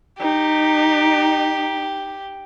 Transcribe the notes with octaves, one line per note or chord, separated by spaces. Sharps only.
D#4 G4